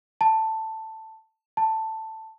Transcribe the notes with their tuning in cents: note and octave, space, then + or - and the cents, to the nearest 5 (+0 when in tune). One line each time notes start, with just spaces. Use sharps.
A5 +10
A5 +10